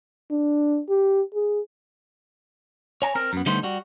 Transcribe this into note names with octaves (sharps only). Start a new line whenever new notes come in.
D4
G4
G#4
C#5 G#5 A#5
C4 A#4
F#2 B3
D3 G3 A3 B3 D#4 C5
G3 F#4